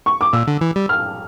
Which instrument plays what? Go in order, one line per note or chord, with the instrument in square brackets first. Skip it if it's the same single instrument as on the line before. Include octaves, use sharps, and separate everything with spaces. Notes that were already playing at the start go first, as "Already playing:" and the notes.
[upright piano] C#6
D6
[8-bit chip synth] A#2 [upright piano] E6
[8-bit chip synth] D3
E3
G3
[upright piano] F6